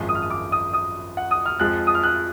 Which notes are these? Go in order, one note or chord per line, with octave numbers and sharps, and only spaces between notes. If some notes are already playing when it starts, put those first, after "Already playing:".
Already playing: G#1 F#2 F3 G#3
D#6
F6
D#6
D6
D#6
D#6
F#5
D#6
F6
F2 F3 G#3 F#6
D#6
F6
F#6